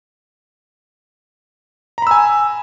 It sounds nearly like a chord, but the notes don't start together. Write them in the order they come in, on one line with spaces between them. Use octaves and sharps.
A#5 B5 E6 G#5